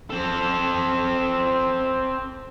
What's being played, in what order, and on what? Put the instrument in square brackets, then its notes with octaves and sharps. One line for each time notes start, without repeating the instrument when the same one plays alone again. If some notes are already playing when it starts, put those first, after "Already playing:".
[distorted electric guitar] C4 A4